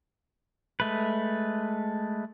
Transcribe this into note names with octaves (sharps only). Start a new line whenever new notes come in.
G#3 A3 B4